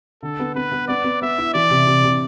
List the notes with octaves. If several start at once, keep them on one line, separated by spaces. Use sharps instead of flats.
D3 A4
B3
B3 B4
B3
B3 D5
B3
B3 E5
E4
E3 D5
C3
C3
C3